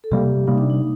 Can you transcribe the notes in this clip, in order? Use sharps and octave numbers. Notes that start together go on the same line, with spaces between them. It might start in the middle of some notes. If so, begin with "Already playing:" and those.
A4
C3 G3 A#3 G4
C3 G3 A#3 D#4
D4
D#4